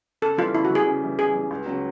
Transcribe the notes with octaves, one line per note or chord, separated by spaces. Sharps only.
C#3 A4
E3 G3 F4
C#3 E4
F#4
E3 G3 G#4
C#3
E3 G3
C#3 G#4
E3 G3
C#2
C#3 F#3